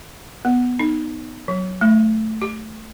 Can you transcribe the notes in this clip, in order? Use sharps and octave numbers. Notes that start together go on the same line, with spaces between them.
B3
D#4
F#3
A3
G4